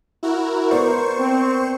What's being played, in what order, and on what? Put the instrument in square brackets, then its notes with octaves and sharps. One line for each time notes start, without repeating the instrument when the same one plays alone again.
[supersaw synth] E4 F#4 A#4
[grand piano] B3 A#4 D5 [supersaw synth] C5 C#6
[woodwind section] C4